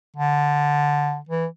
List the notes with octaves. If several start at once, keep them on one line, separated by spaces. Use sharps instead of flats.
D3
E3